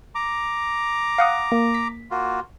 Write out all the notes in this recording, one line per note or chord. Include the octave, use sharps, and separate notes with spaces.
A#5 D6
F5 F#5 D#6
A#3
B6
A#3 F4 F#4